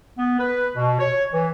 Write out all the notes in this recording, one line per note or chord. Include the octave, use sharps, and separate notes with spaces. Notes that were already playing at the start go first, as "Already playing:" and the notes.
B3
B4
B2
C#5
E3